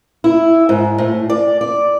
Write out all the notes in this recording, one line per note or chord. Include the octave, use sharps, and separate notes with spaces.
E4
G#2
A2
D5
D5